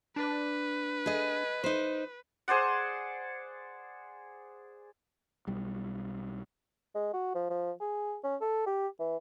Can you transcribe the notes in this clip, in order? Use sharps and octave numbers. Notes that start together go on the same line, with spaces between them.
D4 B4
G#4 D#5
D#4 C5
G#4 C5 D5 F#5
B1 G3
G#3
F#4
F3
F3
G#4
C#4
A4
G4
E3